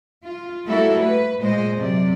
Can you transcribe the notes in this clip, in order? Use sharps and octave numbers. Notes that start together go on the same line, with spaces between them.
F4
G3 A3 A#3 E4 F#4 A4
B4
A#2 G#3 C5 D#5
F#2 C3 D5